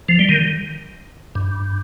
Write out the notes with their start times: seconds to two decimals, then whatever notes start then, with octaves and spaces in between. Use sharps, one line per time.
0.09 F3
0.19 G3
0.29 D#3
1.35 G2